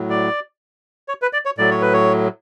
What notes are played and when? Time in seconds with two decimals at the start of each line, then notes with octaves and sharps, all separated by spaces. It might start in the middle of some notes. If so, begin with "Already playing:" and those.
Already playing: A2 F#3
0.10 D5
1.08 C#5
1.22 B4
1.33 D5
1.46 C#5
1.58 A2 F#3 D5
1.71 C#5
1.82 B4
1.93 C#5